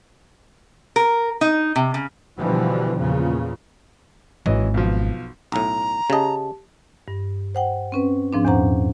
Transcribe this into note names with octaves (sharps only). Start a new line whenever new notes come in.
A#4
D#4
C3
C#3
B2 D3 E3 F3 G3
E2 A#2 C#3
G#1 E3 F#3 D#5
B1 F3
B1 A2 A#5
C#3 G4 D#5 A5
G2
C5 F#5 G5
C4 C#4 B4
G#2 F3 C4 D4
E2 A#2 C#4 C5 F#5 A#5